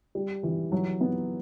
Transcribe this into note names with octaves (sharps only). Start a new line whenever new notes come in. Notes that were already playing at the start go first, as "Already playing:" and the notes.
G3
E3
F#3
B3